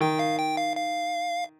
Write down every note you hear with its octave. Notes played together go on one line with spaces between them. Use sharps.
D#3 G5
F5
G5
F5
F5